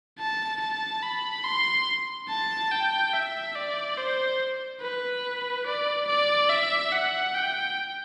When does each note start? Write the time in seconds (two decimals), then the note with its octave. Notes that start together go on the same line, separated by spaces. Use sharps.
0.19 A5
0.61 A5
1.03 B5
1.44 C6
2.29 A5
2.71 G5
3.14 E5
3.55 D5
3.97 C5
4.81 B4
5.66 D5
6.07 D5
6.49 E5
6.92 F#5
7.34 G5